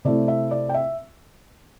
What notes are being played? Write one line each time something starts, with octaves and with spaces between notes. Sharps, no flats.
C3 A3 E4 D5
E5
D5
G5
E5